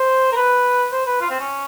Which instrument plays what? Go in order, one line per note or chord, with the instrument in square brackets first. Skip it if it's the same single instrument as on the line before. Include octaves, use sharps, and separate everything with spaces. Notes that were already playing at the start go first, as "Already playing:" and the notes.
Already playing: [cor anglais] C5
A#4
B4
C5
B4
F4
C4
C#4